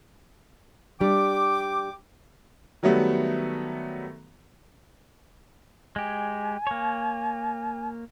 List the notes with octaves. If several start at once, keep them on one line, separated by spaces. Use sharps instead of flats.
G3 D4 G5 D6
D#3 F#3 G3 A3 B3
G#3 G4 G#5
A#3 C#5